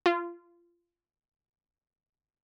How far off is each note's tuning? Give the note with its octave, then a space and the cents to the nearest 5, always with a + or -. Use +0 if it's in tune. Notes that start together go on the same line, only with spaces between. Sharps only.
F4 -20